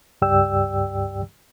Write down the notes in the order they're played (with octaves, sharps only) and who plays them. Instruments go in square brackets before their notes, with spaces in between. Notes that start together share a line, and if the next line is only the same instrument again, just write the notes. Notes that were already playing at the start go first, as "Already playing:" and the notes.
[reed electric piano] C#2 G2 G4 D5 G5 E6